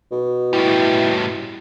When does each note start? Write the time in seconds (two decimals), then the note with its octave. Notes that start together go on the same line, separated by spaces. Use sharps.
0.12 B2
0.53 A2 G3 E4